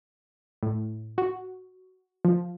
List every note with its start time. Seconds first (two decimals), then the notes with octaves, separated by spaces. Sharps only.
0.63 A2
1.18 F#4
2.25 F3